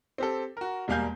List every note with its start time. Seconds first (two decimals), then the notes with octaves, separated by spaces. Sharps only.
0.18 C4 G4 A4
0.57 F#4 A#4
0.88 E1 G3 A#3 F5 G#5 G6